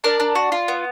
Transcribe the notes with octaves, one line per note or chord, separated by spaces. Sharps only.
D4 A#4 D5
D4
F#4
F4
B3